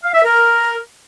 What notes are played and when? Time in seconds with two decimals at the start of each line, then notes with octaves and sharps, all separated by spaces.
0.03 F5
0.14 E5
0.25 A#4